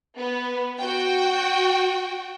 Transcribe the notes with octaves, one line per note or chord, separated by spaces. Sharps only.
B3
F#4 G5